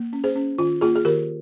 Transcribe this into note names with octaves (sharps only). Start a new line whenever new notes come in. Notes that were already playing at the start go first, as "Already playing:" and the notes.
Already playing: A#3
C#4
G#4 C5
C#4
D#3 F4
A#3 F4 G#4
G#4
D#3 G4 A#4